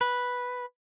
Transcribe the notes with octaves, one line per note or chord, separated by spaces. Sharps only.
B4